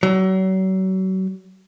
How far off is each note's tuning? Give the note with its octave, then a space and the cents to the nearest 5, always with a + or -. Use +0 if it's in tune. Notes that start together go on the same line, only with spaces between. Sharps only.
F#3 +35